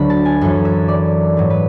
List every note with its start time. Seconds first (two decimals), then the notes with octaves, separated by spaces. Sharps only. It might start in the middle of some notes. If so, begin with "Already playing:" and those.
Already playing: D2 D3 F#3 B5
0.10 A5
0.25 G#5
0.41 F#2 E3 A4
0.65 E5
0.88 D5
1.36 G#2 F#3 B4
1.50 B4